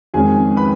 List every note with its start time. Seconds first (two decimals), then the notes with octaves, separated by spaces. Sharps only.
0.14 F2 D#3 G#3 C#4 G#4 G#5
0.57 B4 B5